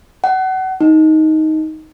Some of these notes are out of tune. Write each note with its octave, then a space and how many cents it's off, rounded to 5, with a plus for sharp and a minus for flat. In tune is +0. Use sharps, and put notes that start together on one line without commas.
F#5 +30
D#4 +10